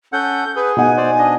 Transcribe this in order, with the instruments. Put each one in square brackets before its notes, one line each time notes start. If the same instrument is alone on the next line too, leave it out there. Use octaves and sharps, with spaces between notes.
[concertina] C#4 A4 F#5 [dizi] G6
[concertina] G#4 [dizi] B4
[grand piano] B2 D#4 F#5 [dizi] G#5
[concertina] C5 D5
D4 D#5